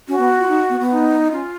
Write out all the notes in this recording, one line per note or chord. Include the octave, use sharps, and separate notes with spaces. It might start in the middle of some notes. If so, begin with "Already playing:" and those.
C#4 F#4
B3
F4
D#4
B3
B3
D#4
C#4 F4